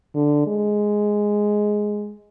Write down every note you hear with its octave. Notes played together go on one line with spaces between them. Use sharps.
D3
G#3